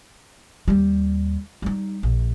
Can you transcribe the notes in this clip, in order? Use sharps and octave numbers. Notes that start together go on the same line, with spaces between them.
D#2 G3
G3 D#4
A#1